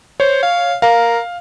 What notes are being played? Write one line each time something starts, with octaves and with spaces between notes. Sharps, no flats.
C5 C#5
F5
A#4 F5